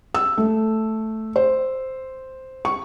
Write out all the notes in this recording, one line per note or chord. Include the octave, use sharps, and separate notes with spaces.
E6
A3
C5
C#6